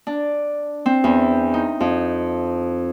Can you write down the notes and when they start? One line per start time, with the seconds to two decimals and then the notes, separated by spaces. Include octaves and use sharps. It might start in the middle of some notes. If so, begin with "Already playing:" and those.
0.07 D4
0.86 C4
1.04 E2
1.54 D#4
1.80 F2